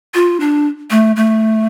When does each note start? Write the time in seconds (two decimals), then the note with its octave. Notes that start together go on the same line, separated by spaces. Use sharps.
0.14 F4
0.40 D4
0.91 A3
1.16 A3